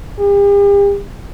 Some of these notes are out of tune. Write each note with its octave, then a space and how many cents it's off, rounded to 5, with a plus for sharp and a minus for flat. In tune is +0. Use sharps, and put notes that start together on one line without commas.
G4 +45